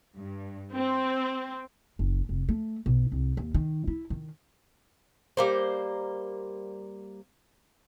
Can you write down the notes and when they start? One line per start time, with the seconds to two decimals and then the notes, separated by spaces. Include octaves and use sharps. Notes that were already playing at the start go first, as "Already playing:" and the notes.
0.16 G2
0.73 C4
1.99 F#1
2.29 F1
2.49 A3
2.86 B1
3.12 C2
3.37 D#2
3.54 D#3
3.87 E4
4.10 D#3
5.37 G3 A#3 C5